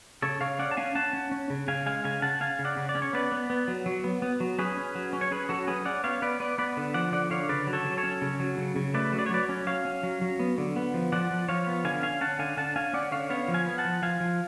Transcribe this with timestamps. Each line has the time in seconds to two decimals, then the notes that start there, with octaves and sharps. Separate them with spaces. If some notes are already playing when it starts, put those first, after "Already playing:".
0.22 C#3 A4 C#5
0.41 C#3 C#5 F5
0.59 C#4 D5 F#5
0.71 A5
0.77 C#4 F5 G#5
0.95 C#4 F#5 A5
1.13 C#4
1.31 C#4
1.50 C#3
1.68 C#3 F5 G#5
1.86 G#3 F5 G#5
2.04 C#3 F5 G#5
2.22 C#3 F#5 A5
2.40 C#4 F5 G#5
2.59 C#3
2.65 D5 F#5
2.77 C#3
2.89 D5
2.95 C#4
3.02 C#5
3.13 B3 B4 D5
3.32 B3
3.50 B3
3.68 F#3
3.86 F#3
4.04 B3
4.22 B3
4.40 F#3
4.59 C#4 G#4 B4
4.77 C#4
4.95 F#3
5.13 C#4
5.21 C#5
5.31 C#4 G#4 B4
5.49 F#3 F#4 A4
5.68 C#4 G#4 B4
5.85 C#4 D5 F#5
6.04 B3 C#5 F5
6.22 B3 B4 D5
6.40 B3 B4 D5
6.58 B3 B4 D5
6.77 D3
6.94 F3 D5 F#5
7.12 D3 D5 F#5
7.30 D3 C#5 F5
7.49 C#3 B4 D5
7.67 F#3
7.73 A4 C#5
7.85 F#3
7.97 A4 C#5
8.03 C#4
8.22 C#3
8.40 F#3
8.58 C#3
8.76 C#3
8.94 A3 B4 D5
9.12 F#3
9.19 D5
9.26 C#5
9.30 F#3 B4 D5
9.49 C#4
9.67 F#3 C#5 F5
9.85 C#4
10.03 F#3
10.21 F#3
10.39 B3
10.58 D3
10.76 B3
10.94 F3
11.12 F3 D5 F#5
11.30 F3
11.48 F3 C#5 F5
11.67 B3
11.84 D3 F5 G#5
12.03 C#4 F5 G#5
12.21 C#4 F#5 A5
12.39 D3 F5 G#5
12.57 D3 F#5 A5
12.76 C#4 F5 G#5
12.93 C#4 D5 F#5
13.12 D3 C#5 F5
13.30 B3 C#5 F5
13.48 F3
13.54 F5 G#5
13.66 B3
13.78 F#5 A5
13.85 F3
14.02 F3 F5 G#5
14.21 F3